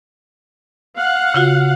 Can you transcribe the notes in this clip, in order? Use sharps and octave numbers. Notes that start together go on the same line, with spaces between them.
F5 F#5
C#3 F4 F#4